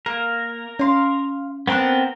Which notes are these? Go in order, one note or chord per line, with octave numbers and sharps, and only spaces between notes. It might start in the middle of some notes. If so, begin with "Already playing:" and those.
A#3 A#4
C#4 F5 C6
B3 C4 D4 A4 A#4 F#5